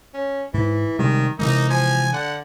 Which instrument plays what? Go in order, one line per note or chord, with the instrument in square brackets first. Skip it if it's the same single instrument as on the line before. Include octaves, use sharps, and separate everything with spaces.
[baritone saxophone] C#4
[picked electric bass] G#2 [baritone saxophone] E3
[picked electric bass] C3 G3 G#3 [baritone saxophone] D#3
[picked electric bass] C3 E3 G#3 [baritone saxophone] A#3 [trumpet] D#4
[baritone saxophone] F3 [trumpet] G#5
[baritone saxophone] D3 [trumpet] F#5